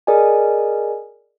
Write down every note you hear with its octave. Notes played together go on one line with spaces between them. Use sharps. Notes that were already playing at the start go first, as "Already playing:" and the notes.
G#4 A#4 D5 D#5 G#5